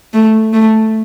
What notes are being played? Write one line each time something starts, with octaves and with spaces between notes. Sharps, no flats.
A3
A3